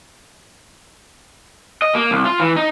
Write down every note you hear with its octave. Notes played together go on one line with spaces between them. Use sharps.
D#5
A#3
C2
F4
E3
D#4